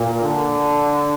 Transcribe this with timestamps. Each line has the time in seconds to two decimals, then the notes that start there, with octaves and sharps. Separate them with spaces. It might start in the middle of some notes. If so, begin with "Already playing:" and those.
Already playing: A#2
0.23 D3